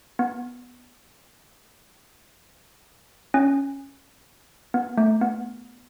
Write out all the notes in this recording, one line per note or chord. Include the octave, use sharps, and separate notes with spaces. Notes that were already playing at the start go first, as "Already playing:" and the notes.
B3
C#4
B3
A3
B3